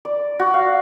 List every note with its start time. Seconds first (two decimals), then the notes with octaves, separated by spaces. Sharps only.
0.05 D5
0.39 F#4
0.54 F5